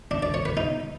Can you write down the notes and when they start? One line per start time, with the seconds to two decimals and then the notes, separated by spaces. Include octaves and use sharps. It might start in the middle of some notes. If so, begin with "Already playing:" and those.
0.11 D4
0.23 D5
0.34 C#5
0.45 B4
0.57 D#4